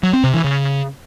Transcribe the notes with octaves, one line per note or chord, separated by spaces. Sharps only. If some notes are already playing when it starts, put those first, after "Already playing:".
F#3
C4
C3
E3
C#3